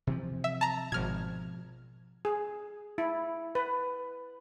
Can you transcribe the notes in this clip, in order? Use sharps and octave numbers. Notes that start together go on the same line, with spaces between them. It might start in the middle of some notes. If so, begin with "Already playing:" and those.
C3 E3 F3
E5
A5 A#5
G#1 B2 F3 F6 G#6
G#4
E4
B4